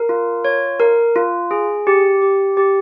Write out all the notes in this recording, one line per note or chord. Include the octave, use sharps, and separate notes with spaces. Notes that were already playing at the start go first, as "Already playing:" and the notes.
Already playing: A#4
F4
C#5
A#4
F4
G#4
G4
G4
G4